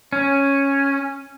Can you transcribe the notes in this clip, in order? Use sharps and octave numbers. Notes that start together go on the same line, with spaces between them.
C#4